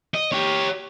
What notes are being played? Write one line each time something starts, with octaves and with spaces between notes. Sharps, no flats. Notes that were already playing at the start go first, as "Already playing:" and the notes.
D#5
G4 C#5